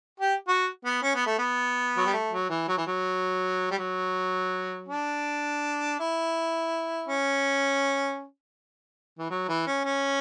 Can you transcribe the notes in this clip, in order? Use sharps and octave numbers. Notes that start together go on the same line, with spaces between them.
G4
F#4
B3
C#4
B3
A3
B3
F#3
G3
A3
F#3
E3
F#3
E3
F#3
G3
F#3
D4
E4
C#4
E3
F#3
E3
C#4
C#4